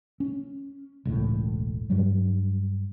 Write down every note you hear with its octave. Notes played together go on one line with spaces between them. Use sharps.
C#4
E1 C#2 A2
G2 F#3 G3